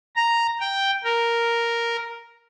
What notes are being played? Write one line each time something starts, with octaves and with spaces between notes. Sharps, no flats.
A#5
G5
A#4